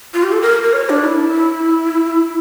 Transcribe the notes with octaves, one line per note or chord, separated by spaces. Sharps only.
F4
G4
A4
A#4
A#4
C#5
D4
E4